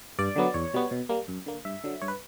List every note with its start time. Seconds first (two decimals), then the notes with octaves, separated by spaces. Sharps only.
0.19 G2 D5
0.36 D3 F#3 B3
0.54 E2 C#5
0.74 B2 G3 B3
0.91 B2
1.09 G3 A#3
1.28 F#2
1.46 D3 A#3
1.65 G2 E5
1.84 D3 F#3
2.01 G2 C#5
2.08 B4